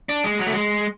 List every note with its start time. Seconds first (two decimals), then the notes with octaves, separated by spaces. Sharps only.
0.09 D4
0.24 G#3
0.39 F#3
0.47 A3
0.54 G#3